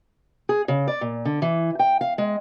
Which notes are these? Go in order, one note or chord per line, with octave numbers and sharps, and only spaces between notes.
G#4
C#3
D5
A#2
D3
E3
G5
F5
G#3